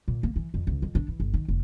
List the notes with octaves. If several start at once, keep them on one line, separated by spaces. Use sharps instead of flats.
A#2
A#3
E3
F2
C#2
F2
D4
E3
G1
D#3
F1